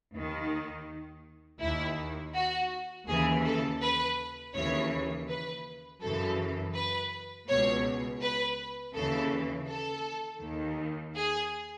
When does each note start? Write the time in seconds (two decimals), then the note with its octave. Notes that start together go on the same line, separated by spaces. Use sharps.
0.14 D#2 D#3
1.60 D#2 D#3 E4
2.34 F#4
3.08 D#2 C#3 E3 G#4
3.44 A4
3.81 B4
4.54 D#2 C#3 E3 C#5
5.28 B4
6.02 F#2 C#3 E3 A4
6.74 B4
7.48 C#2 B2 C#5
8.21 B4
8.95 D#2 C#3 E3 A4
9.69 A4
10.42 D#2 D#3
11.15 G#4